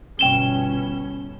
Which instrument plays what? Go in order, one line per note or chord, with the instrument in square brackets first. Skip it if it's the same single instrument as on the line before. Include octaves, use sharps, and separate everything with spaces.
[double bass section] G1 B2 C#4 [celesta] G5 E7 G7